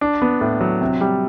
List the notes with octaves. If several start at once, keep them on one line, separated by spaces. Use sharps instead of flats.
D4
B3
A2
F#3
C3
G3